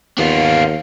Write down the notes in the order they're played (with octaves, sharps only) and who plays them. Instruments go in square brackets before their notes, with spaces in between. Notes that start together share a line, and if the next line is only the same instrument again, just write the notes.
[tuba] D#2 [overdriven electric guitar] B3 F4